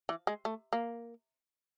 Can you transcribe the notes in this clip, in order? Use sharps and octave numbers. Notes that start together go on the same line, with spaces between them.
E3
G#3
A3
A#3